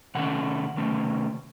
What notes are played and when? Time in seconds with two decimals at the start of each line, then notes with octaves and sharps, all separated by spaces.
0.15 C3 D#3 A3 C#4 F#5
0.77 C3 D#3 A3 C#4